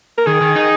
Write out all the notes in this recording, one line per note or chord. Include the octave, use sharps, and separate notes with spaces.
A#4
D#3 G#4
D#3
D#4